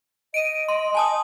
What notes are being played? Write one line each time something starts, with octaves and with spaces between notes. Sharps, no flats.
D#5 D7 D#7
C6
G#5 A5 D#6